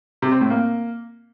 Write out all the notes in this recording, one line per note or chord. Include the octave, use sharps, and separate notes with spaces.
C3
C4
A2
A#3